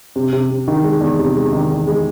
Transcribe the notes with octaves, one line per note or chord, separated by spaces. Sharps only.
C3
C3
C3
D#3
G#3
E2
C3
G#3
D#3
E2
G#3